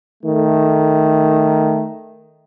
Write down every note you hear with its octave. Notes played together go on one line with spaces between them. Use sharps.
D#3 A3